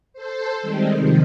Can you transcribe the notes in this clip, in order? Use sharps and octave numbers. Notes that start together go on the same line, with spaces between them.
A4 C5
D#3 G3 G#3 C4
C3 D#3 F3